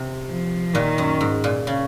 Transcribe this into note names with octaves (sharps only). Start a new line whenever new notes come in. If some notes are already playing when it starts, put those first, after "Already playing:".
Already playing: C3
F3
A#2 D#3
F#2
G#2
A#2
C#3